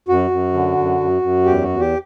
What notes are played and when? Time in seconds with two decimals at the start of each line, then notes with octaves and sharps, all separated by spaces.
0.08 F#2 F#4
0.31 F#2
0.53 D3
0.77 F#2
1.00 F#2
1.22 F#2
1.46 E2 G4
1.63 F#4
1.69 E2
1.80 G4